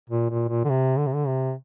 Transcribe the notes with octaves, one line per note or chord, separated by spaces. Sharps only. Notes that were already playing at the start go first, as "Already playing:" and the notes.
A#2
A#2
A#2
D3
C3
D3
C3
D3
C3